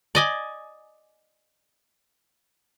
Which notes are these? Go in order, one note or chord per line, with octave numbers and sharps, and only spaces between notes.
D5 D#5 G#5